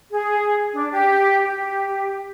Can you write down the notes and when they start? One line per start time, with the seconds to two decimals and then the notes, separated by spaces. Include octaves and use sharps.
0.10 G#4
0.73 D4
0.91 G4
1.42 G4